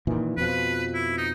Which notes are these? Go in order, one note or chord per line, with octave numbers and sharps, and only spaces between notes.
A#2 D#3 E3
F2 B2 F3 B4
E4
D#4